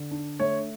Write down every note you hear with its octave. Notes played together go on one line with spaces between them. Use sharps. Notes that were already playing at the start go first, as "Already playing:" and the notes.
Already playing: D3
D4
A3 C#5